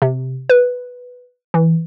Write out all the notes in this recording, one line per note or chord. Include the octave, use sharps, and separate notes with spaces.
C3
B4
E3